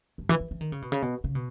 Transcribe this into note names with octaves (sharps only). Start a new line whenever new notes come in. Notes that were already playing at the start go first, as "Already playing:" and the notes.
G2
E3
E3
E3
D#3
C#3
B2
C#3
B2
C#3
B2